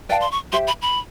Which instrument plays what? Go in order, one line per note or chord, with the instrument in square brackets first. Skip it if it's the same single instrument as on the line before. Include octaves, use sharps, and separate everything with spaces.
[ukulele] B4 D5 F5 A5 [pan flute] G5
[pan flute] C6
C#6
[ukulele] G4 C5 E5 [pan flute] C6
[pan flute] B5
B5